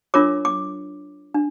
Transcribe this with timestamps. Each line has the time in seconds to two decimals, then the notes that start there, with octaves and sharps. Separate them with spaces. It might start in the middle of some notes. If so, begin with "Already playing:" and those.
0.14 D4 F4 A#4 C#5 D6
0.45 D6
1.34 D4